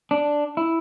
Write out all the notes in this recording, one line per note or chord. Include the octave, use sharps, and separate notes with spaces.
D4
E4